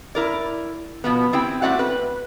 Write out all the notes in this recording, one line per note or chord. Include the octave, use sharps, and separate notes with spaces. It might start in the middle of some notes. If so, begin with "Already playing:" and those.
E4 A#4 D5
B2 F3 B3
G3 C4 E4 G5
A3 C4 F#4 D5 E5 F#5
B4